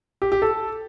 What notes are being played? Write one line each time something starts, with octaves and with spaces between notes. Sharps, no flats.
G4
G4
A4